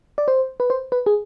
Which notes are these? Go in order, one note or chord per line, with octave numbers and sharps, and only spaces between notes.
D5
C5
B4
C5
B4
G#4